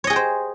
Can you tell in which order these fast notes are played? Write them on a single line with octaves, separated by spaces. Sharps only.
C#5 D#5 G#4 G5 C5